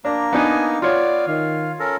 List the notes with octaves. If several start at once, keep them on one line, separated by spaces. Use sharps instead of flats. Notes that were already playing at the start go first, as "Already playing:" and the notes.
A#3 D4 A#5
B3 D4 D#4 G#5
B3 F4 C#5 D5
D#3 F5
C#4 A4 A#4